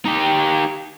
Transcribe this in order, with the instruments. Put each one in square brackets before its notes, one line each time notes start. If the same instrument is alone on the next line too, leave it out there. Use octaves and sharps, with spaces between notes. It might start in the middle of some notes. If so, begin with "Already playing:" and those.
[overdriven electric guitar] D#4 G4